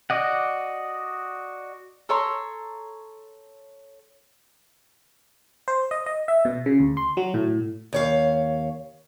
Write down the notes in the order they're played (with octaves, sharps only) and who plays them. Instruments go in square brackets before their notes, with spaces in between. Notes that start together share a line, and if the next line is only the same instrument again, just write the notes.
[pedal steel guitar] F#4 D5 D#5 F#5
[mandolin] A4 C#5 A#5 C6
[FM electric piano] C5
D#5
D#5
E5
B2
C#3
D2
C6
F#3
A2
[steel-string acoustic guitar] D#2 C#5 F5